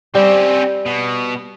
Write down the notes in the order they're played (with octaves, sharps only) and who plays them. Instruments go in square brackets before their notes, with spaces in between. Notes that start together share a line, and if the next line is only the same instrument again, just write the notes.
[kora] G3 [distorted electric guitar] C4 C#4
[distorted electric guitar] B2